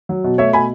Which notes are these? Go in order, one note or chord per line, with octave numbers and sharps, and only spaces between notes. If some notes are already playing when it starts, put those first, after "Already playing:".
F#3
B2
A3 C#5 E5
B2 G#5 B5